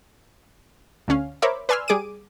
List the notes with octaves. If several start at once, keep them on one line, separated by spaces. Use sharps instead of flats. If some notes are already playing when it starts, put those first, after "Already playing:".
D2 D3 C#4 F5
A#4 C5 C#5 E5 B5 D6
B4 D5 G#5 C6 E6 F6
G3 G#4 D6 D7 D#7